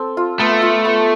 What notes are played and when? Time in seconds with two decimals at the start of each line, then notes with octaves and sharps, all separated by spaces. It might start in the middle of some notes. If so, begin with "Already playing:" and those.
Already playing: C4 A4
0.17 F4
0.40 A3 B3
0.62 F4
0.85 B3